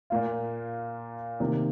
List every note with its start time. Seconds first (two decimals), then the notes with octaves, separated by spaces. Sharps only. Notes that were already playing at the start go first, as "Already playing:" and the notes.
0.10 A#2 A#3 F4
1.40 C3 D#3 A#3